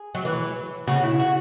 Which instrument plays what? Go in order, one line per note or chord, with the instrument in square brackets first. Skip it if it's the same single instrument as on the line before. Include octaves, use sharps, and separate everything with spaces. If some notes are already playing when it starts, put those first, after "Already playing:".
Already playing: [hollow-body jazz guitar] G#4
[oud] F#3
E3
[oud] C#3 [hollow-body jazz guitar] F#4
[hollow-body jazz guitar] E4
F#4